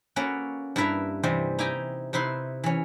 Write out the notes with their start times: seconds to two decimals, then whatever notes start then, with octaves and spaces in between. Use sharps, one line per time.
0.16 A#3 C#4 F#4 A4 B4
0.76 G2 E4 A#4 B4 E5 F5
1.23 C3 E3 G3 C5 D#5
1.59 D#4 E4 G4 G5 G#5 A#5
2.13 C3 D#4 E4 B4 C6
2.64 E3 C#4